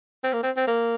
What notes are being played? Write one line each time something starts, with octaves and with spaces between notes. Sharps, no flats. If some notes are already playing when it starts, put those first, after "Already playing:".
C4
A#3
C4
C4
A#3